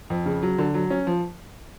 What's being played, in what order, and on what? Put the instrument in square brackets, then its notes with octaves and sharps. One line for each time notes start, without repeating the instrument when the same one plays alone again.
[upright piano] F2
C#3
F#3
D3
F#3
C#4
F3